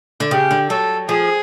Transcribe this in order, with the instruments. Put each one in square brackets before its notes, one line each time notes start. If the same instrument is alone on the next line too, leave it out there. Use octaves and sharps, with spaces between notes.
[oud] D3
[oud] C#3 [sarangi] G4
[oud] D3
[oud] F#3 [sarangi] A4
[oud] F3 [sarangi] G#4